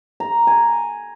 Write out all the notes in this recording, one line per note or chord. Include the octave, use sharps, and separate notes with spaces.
A#5
G#5